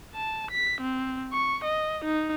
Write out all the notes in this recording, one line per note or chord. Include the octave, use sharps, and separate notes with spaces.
A5
B6
C4
C#6
D#5
D#4